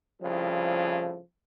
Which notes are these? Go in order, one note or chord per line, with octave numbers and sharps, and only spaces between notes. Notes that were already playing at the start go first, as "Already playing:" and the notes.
C2 A2 C#3 F3